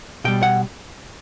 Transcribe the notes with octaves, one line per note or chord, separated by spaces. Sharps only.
B2 G3 G5
F#5